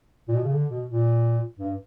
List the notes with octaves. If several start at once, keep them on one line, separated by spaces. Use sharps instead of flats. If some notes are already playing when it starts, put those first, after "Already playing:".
A#2
B2
C#3
D3
B2
A#2
G2